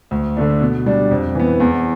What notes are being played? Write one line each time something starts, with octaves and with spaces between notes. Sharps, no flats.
D2
D3 A3 D4
B2
G3 D4
F2
E3 B3
E2